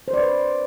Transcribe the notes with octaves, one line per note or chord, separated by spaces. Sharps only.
C5
D5
B4